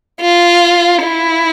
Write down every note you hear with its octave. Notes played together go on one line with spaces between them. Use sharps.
F4
E4